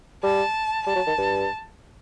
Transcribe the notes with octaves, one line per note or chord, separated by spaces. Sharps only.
G3 A5
G3 A5
F#3
D#3
G2